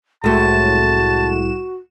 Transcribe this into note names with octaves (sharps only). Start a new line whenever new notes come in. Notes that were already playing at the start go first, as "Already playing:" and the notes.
C2 A2 G#3 A3 F#4 A5 E7